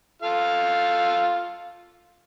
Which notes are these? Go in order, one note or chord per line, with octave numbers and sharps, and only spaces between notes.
F4 A4 F5